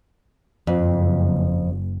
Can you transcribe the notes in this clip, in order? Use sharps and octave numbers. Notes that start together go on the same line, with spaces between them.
F#1 F2